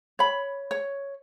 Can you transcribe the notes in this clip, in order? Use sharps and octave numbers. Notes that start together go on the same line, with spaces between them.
C#5 B5
C#5